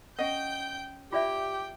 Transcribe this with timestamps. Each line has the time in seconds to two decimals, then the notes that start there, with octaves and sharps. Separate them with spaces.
0.19 C#4 D#5 F#5 G5 G6
1.12 F4 G4 D5 E5 G5